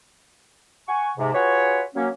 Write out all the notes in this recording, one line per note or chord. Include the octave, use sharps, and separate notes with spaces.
F#5 G#5 C#6
G#2 C3
F4 F#4 G#4 B4 C#5
F#3 A#3 C#4